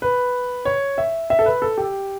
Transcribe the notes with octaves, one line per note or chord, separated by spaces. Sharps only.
B4
C#5
E5
E5
A4
B4
A4
G4